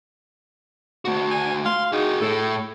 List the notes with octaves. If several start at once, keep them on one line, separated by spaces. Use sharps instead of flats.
A3 F#4
G#5
F5 C6
D#4 F#4 G#4
A2 A4